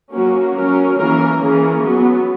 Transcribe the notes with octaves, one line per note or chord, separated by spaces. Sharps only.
F#3 A#3 C#4 F#4
F#3 C#4 A#4
E3 A#3 C#4 A#4
E3 A#3 C#4 G#4
F#3 B3 F#4